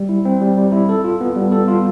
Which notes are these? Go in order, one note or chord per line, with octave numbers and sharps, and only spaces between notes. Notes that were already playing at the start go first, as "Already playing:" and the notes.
Already playing: G3
E4
C4
G3
G3
E4
A4
F4
B3
G3
A4
F4